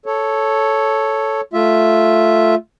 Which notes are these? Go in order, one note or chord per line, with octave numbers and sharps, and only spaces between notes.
A4 C#5
A3 F4 E5